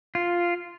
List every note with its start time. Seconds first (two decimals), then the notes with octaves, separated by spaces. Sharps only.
0.15 F4